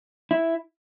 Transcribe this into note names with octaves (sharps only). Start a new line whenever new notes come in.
E4